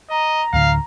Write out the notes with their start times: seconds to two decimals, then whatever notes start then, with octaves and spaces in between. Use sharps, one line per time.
0.11 D#5 A#5
0.53 D2 A2 D3 F5